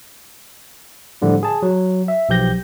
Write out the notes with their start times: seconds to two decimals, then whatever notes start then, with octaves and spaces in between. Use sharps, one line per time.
1.22 A2 D3 F3 G3
1.43 G#4 A5
1.62 F#3
2.08 E5
2.29 B1 F3 G4 G6 A#6